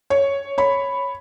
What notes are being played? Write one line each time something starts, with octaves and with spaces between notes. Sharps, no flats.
C#5
C#5 B5